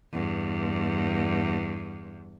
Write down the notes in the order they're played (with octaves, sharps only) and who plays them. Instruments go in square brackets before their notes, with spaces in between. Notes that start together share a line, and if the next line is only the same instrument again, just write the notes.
[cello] E2 G2